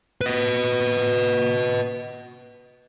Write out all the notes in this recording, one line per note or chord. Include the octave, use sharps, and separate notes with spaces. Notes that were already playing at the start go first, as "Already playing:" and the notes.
B4 D#5